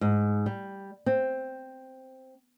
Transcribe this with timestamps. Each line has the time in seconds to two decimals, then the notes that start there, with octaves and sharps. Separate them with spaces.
0.01 G#2
0.46 G3
1.06 C4